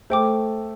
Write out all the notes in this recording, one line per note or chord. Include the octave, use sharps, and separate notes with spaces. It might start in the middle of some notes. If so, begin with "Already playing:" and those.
A3 A4 C5 G5 D6